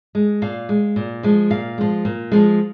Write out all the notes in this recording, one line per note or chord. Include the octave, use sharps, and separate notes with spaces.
G#3
A#2 F5
G#3
A#2
F3 G#3
A#2 F5
F3 G#3
A#2
F3 G#3